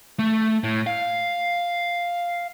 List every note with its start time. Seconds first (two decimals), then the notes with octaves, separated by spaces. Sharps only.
0.19 A3
0.64 A2
0.87 F5